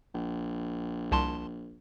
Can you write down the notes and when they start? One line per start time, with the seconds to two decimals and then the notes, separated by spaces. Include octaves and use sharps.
0.14 A#1
1.12 C2 A5 C6